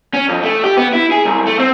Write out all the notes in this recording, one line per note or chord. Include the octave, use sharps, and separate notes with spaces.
C#4
F2
A3
G4
B3
E4
G#4
C2
A3
C4